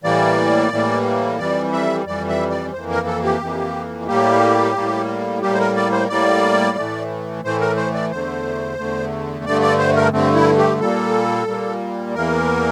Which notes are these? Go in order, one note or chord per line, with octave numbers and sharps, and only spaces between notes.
A2 E3 G3 A#3 D5
A2 E3 G3 A#3
F2 E3 G3 D5
E5
F2 E3 G3 D5
E5
D5
F2 E3 A#3 C5
A#4
A4
G4
F2 E3 A#3
A2 G3 A#3 G4
A2 G3 A#3
A2 G3 A#3 G4
C5
A#4
D5
C5
A2 G3 A#3 D5
A2 E3 A3
A2 E3 A3 C5
A#4
C5
D5
E2 D3 A3 C5
E2 D3 A3
G2 D3 A3 D5
D5
C5
A#4
G2 D3 A3 C4
E4
G4
A#2 G3 A#3 A4
A#2 G3 A#3
E2 E3 A#3 A#4